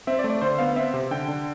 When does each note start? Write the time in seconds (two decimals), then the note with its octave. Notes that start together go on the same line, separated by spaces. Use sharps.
0.07 C4 E5
0.19 D5
0.24 A3
0.30 D5
0.41 D3 C5
0.59 B3 F5
0.76 C4 E5
0.94 C3
1.11 D3 G5
1.28 D3